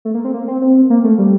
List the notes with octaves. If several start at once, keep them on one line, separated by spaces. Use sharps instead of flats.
A3
A#3
C4
A#3
C4
C4
A#3
A3
G3